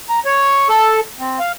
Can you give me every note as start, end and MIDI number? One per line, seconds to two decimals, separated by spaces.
0.09 0.19 82
0.25 0.68 73
0.69 1.00 69
1.20 1.39 60
1.39 1.52 77